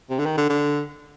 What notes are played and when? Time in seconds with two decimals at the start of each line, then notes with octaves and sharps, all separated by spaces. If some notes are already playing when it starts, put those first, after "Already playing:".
0.10 C3
0.19 D3
0.26 D#3
0.38 D3
0.49 D3